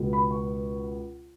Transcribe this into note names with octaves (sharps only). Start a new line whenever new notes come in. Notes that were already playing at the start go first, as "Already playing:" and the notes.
Already playing: C#2 B2 G#3
B5
C#6